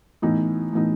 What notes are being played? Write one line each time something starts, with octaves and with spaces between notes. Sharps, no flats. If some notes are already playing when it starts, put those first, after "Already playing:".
A2 E3 B3 D#4
A2 E3 B3 D#4